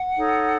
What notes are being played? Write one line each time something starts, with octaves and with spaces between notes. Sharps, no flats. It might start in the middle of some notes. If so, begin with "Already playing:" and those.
Already playing: F#5
D#4 A4 C#5